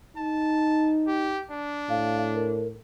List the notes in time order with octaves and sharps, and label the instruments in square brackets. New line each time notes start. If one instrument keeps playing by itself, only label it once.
[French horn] D#4 [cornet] A5
[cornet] G4
D4
[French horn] A2 [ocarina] F5
[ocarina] A#4